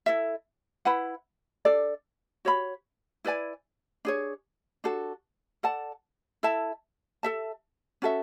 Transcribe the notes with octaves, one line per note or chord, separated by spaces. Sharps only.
E4 A4 E5
E4 B4 F#5 B5
D4 A4 D5
F#4 C#5 G#5 B5
E4 B4 D5 G#5
D4 G#4 C#5
D4 F#4 A4
A4 D5 F#5 A5
E4 A4 E5 A5
A4 E5 A5
C#4 F#4 A4 E5